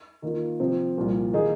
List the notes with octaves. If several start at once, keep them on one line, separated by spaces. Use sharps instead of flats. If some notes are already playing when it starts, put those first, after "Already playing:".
D#3 A#3 F4
C3 F3 C4
C2 A#2 F3
D#3 A#3 D#4 G#4